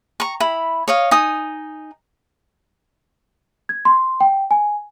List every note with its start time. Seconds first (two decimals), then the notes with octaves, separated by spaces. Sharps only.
0.20 A#5 C#6
0.40 E4 B5
0.88 C#5 D#5 F5
1.11 D#4 G#5 D#6
3.69 G#6
3.85 C6
4.20 G5
4.51 G#5